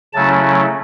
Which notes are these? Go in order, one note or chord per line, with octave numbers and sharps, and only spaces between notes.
C#3 F#3 A3 C#4 E4 A5